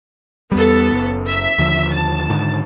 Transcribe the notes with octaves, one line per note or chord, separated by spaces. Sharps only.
E2 G3 B3 A4
F#1
E5
D#2 D3 F3
A5
G#2 D3 D#3